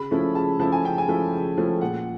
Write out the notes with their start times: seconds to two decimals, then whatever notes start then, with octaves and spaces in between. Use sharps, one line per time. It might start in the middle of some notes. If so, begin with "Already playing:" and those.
Already playing: C#3 B5
0.11 F3 A3 C#4 E4
0.35 C#3 A5
0.59 F3 A3 C#4 E4 A5
0.72 G#5
0.84 C#3 G5
0.98 G#5
1.08 F3 A3 C#4 E4
1.32 C#3
1.57 F3 A3 C#4 E4
1.81 A#2 F#5